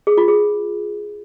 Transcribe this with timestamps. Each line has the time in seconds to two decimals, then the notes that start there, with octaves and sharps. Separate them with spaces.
0.07 G#4
0.17 F4
0.28 G#4